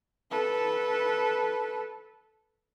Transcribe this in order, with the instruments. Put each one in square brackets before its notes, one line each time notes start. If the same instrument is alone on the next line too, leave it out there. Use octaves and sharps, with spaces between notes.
[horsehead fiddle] A4 B4